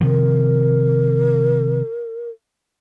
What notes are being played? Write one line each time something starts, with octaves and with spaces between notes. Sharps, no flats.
C3 D#3 F3 A#4